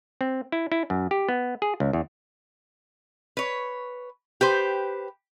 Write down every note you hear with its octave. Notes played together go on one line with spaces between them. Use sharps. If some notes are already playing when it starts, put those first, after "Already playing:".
C4
E4
E4
F#2
G4
B3
G#4
C#2
E2
B4 C#5
G4 B4 C5